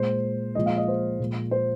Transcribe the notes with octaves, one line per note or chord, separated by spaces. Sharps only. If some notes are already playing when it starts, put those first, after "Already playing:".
Already playing: A#2 G#3 C5
A#2 F3 G#3 D#5
F5
D#5
C5
A#2 F3 G#3
C5